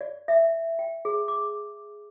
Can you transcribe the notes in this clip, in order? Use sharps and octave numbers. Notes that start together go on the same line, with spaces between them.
D5
E5
G5
G#4
D6